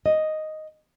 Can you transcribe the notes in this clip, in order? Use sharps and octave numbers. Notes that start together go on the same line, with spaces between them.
D#5